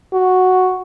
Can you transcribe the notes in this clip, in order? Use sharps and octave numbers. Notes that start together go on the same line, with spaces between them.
F#4